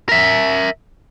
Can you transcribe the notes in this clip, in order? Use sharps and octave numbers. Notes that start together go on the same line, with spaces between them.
A#4 E5